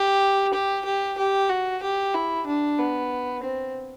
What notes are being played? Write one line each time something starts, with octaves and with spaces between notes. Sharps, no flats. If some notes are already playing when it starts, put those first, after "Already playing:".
Already playing: G4
G4
G4
G4
F#4
G4
E4
D4
B3
C4